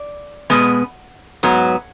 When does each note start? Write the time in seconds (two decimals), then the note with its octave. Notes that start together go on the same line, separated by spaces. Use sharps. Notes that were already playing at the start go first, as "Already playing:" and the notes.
Already playing: D5
0.50 B2 G#3 B3
1.43 G#2 F#3 B3